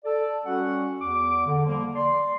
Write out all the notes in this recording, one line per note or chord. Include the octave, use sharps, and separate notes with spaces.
A4 D5
G3 C#4 F#4 F#5
E2 D6
D3
F3 G3 A#3
D5 C6